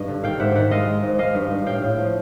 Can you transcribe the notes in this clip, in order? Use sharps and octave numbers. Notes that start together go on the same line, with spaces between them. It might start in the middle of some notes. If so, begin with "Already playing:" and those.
Already playing: G2 D#5
D3
D#3 F5 G5
G#2 E5 F#5
D#3 E5 F#5
G#3 D#5 F5
G#3
G#2
G#3 D#5 F5
G2
G2
A2 F5 G5
A2
F3